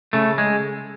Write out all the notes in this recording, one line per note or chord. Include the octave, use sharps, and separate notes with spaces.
C#3 A3
G#3